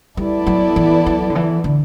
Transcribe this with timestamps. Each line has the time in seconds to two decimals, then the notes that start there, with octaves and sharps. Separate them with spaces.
0.17 G3 B3 E4 A4 D5
0.47 F#3
0.76 E3
1.06 F#3
1.30 D3
1.35 E3
1.64 D3